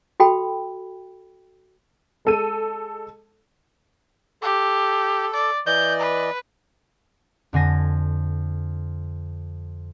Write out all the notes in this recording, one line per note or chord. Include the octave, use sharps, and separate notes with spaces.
F#4 A4 G5 B5
G#3 A4 D#7
G4 A4
D5
E3 D5 D#5 G6
B4
F2 D3 G#5 A#6